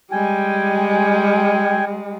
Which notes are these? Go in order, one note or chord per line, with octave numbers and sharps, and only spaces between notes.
G3 G#3 G5 G#5